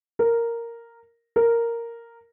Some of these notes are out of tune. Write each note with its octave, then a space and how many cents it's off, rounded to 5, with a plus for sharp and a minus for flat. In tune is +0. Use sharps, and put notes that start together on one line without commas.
A#4 -5
A#4 -5